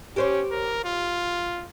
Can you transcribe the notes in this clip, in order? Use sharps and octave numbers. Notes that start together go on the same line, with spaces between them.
C#4 G4 C5 C#5
A#4
F4